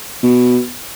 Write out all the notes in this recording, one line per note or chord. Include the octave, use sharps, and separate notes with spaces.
B2